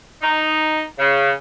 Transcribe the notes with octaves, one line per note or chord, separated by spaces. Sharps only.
D#4
C#3